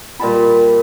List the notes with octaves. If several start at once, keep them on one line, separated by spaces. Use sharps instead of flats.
A#2 G3 A5 B5